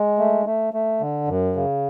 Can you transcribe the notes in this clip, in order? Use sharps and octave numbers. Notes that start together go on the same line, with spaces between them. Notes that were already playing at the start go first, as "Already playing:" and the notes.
Already playing: G#3
A3
A3
A3
D3
F#2
C#3